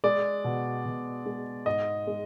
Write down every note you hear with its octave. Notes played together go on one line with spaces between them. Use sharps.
G#3 D5
B2
B2
G#3
G#2 D#5
G#3